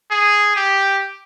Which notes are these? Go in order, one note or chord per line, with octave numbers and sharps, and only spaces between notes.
G#4
G4